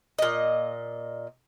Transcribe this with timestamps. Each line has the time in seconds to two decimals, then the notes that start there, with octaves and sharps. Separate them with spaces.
0.19 A#2 D#5